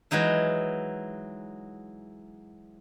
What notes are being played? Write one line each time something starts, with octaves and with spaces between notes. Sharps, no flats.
E3 F#3 G#3 D#4 E4